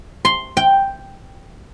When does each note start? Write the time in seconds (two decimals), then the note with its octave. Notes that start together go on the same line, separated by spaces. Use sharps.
0.25 C6
0.57 G5